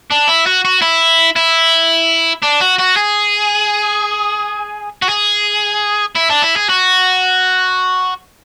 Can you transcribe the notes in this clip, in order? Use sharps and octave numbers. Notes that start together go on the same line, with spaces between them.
D4
E4
F#4
F#4
E4
E4
D4
F#4
F#4
G#4
F#4
G#4
E4
D4
E4
G#4
F#4